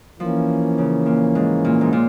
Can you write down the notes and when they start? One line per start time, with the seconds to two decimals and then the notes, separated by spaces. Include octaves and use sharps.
0.19 E3 F3 A#3 C#4
0.78 C#3
1.06 A#2
1.35 G#2
1.65 A#2
1.81 G#2
1.93 A#2